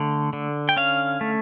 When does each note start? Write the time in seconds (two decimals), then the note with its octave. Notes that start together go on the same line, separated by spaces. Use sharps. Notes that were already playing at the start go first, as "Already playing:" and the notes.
Already playing: D3 A3
0.33 D3
0.69 G5
0.77 C#4 F5
1.21 A3